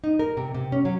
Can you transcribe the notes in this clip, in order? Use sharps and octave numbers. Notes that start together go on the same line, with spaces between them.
D#4
A#4
C3
C3
C#4
F#3